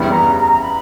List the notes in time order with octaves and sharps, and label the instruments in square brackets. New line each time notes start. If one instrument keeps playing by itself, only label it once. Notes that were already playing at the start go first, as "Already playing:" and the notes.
Already playing: [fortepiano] E2 C#3 G3 B3
[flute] A#5
A#5
A#5
B5